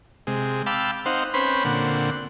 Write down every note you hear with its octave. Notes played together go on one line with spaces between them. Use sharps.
C3 G#3
F5 G5 A5 B5 D6 E6
C4 D#4 C5 F5 F#5
C4 C#4 B4 C5 B5
A#2 D3 C4 F#5